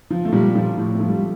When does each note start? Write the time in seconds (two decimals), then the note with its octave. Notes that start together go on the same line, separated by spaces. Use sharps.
0.10 F3
0.25 A3
0.32 A#2 G3
0.55 F3
0.77 A2
0.95 A3
1.00 F3
1.09 G3